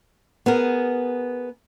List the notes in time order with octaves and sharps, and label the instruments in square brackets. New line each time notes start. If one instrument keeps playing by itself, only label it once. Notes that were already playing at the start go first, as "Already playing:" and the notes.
[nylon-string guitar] B3 G#4 A#4